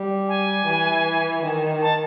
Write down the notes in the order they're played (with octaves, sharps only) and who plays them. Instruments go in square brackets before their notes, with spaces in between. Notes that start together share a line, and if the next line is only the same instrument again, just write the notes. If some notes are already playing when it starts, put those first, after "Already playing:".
Already playing: [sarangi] G3
[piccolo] G#5
[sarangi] E3
D#3
[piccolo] A5